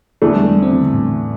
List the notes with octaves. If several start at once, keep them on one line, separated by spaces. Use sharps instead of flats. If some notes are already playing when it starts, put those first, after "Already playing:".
E2 D3 E3 A3 D4
G3
G3
C4
E3
D3
A2